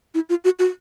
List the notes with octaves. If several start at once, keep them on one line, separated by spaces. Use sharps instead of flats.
E4
F4
F#4
F#4